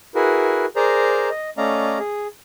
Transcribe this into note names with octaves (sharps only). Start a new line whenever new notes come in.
E4 F#4 G#4 A#4 B4
G#4 A#4 C5 D5 A#5
D#5
A3 C#4 D5 D#5 F5 A#5
G#4